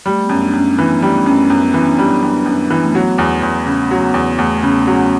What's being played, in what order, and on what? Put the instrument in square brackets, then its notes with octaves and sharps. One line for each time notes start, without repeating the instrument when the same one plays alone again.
[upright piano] G3 [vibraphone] A3
[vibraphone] B3
[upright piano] F#2
[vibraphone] D4
[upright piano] F#2
[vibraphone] C#4
C#4
[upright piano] E3 [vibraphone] B3
[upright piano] G3
[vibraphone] A3
[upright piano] F#2
[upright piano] F#2 [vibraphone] B3
[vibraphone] B3
[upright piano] E3 [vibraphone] C#4
[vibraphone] D4
[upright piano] G3
[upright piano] F#2 [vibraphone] D4
[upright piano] F#2
E3
[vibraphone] A3
[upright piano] F#3 [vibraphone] B3
[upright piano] E2
E2
C#3
F#3
[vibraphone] B3
[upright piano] E2
[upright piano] E2 [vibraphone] A3
[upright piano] C#3 [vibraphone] B3
[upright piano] F#3 [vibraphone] C#4